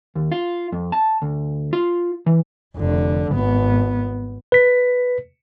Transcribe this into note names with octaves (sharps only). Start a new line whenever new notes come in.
D#2
F4
F2
A5
D2
F4
E3
F1 D3
G#1 B3
B4 B6